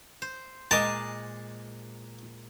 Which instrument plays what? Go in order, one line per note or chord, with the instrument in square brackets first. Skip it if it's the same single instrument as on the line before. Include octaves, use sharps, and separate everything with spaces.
[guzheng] C5
[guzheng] A#2 G#3 G#5 [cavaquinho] A#4 D#5 D6 [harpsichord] A5